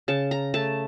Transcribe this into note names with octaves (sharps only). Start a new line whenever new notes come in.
C#3 A5
A#5
A3 A5